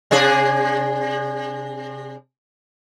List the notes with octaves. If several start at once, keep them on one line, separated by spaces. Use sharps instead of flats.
C3 D4 G#4